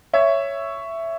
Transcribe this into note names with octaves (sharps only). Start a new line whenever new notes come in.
C#5 E5